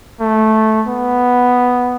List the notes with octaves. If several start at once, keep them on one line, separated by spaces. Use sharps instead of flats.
A3
B3